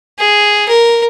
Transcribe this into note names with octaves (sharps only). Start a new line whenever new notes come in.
G#4
A#4